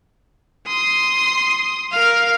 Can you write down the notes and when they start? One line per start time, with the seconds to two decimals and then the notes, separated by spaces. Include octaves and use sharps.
0.67 C6 D#6
1.92 A#4 F5